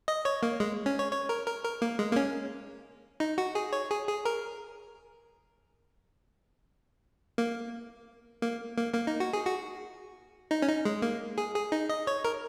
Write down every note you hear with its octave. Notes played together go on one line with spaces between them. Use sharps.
D#5
C#5
A#3
G#3
C#4
C#5
C#5
A#4
A#4
A#4
A#3
G#3
A#3
C#4
D#4
F#4
G#4
C#5
G#4
G#4
A#4
A#3
A#3
A#3
A#3
D#4
F#4
G#4
F#4
D#4
C#4
D#4
G#3
A#3
G#4
G#4
D#4
D#5
C#5
A#4